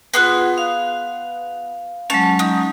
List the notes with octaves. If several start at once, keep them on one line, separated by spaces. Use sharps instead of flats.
B3 F4 G#4 F#5 C6 F#6
F5
F#3 G#3 C#4 A5
D#4